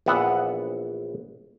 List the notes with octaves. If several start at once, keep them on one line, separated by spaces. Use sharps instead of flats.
A#1 E3 B3 E5 F#5